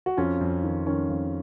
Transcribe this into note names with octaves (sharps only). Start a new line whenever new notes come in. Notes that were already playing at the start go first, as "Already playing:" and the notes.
F#4
F2 C#4 F4
F2
D#3
D#3 C#4
F2